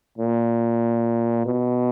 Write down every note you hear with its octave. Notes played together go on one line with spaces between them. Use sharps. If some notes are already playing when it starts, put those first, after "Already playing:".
A#2
B2